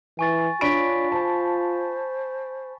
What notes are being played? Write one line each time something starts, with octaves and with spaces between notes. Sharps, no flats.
E3 G#5 C#6 A6
D4 F4 C#5 B5 C#6 B6 D7
C5 A5